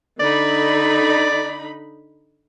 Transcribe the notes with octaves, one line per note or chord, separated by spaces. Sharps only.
D3 D#4 D5 B5